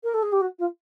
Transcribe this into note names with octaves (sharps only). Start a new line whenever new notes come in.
A#4
A4
G#4
G4
F#4
F4